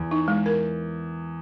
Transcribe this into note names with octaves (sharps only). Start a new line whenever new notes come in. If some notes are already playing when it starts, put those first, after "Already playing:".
Already playing: E2
D#4
G#3
A#4